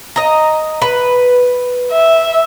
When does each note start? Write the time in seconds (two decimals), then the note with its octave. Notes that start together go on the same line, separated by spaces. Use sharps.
0.16 D#5 A#5
0.82 B4
1.92 E5